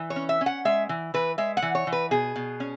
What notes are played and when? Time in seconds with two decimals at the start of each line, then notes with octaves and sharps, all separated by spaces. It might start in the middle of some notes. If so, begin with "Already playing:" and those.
Already playing: E3
0.10 C#5
0.16 C#4
0.29 E5
0.41 C#4
0.46 F#5
0.65 G#3 E5
0.89 E3
1.14 E3 B4
1.38 G#3 E5
1.57 F#5
1.62 E3
1.75 C#5
1.87 E3
1.92 B4
2.11 B2 G#4
2.36 B2
2.60 C#4